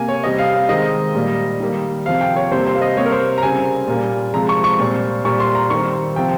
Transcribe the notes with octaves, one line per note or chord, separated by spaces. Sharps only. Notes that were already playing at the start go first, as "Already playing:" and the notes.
Already playing: C3 A#3 G#5
C#5
C3 G3 C4 D#5
F5
F5
D#3 G#3 C4 D#5
A#2 G3 A#3
D#3 G3 A#3
C3 F3 C4 F5
G5
C#5
C3 G3 A#3 C5
C5
F5
D#5
C3 G3 A#3 C#5
A#4
C5
A#5
C#3 G3 C4 G#5
A#2 G3 A#3
C3 F3 G#3 C4 A#5
C#6
C#6
A#2 G3 C4
A#2 G3 C4 C#6
C6
A#5
D#3 G3 C4 C#6
C3 F3 C4 G5